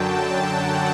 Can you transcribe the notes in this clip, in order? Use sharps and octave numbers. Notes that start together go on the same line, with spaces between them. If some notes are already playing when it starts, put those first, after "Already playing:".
Already playing: F#2 D3 F#3 G5 A5
F#5